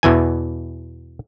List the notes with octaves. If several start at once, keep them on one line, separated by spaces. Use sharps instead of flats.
E2 B2 E3 G#5